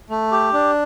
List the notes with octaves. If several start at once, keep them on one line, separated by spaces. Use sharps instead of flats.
A3
G4
D4